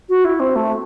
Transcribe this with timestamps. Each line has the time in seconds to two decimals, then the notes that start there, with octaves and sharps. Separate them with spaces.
0.09 F#4
0.24 E4
0.40 C4
0.55 A3